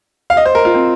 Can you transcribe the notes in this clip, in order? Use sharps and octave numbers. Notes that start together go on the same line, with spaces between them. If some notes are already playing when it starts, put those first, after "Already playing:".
F5
D#5
C5
A#4
F4
C4